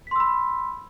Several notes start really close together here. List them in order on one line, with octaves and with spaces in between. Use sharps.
B6 C6 E6 B5